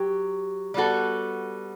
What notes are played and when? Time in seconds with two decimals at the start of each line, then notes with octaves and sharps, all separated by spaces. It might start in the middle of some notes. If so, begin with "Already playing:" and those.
Already playing: F#3 G4
0.74 G3 B3 F#4 A4